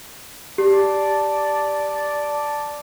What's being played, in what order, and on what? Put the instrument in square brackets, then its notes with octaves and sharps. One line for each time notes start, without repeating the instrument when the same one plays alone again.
[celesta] G4 [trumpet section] D5 A5